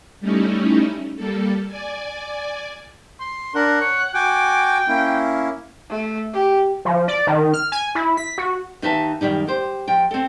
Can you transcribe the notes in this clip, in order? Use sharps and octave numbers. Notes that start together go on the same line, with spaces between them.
G3 A3 C#4 D#4 E4
G3 A#3 A4
D5 G#5
C6
D4 A#4 F#5
C#5
F#4 G5 G#5 D6
A#3 C#4 E4
A3
G4
F3
D5
D#3
F6
G#5
E4
B6
F#4
D#2 D#4 B4 E5 G#5 A5
F#2 D#3 G3 D#4
G4 C5
F3 G5
C4 A4